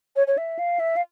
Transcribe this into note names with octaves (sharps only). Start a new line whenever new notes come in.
C#5
C#5
E5
F5
E5
F5